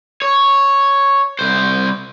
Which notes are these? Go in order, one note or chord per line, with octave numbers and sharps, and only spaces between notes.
C#5
C2 C5